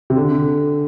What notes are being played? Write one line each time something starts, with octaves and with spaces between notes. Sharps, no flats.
C3
D3